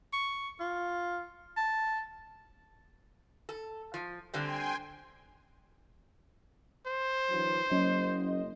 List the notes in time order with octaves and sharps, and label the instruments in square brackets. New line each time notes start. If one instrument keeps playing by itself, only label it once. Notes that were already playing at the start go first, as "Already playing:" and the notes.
[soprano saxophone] C#6
F4
A5
[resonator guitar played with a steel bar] A4
F3
[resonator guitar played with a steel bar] D3 G3 C4 [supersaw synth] G5 G#5 C6
[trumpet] C5
[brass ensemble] D3 E3 F#3
[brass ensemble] F#1 D#5 [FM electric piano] F#3 C#4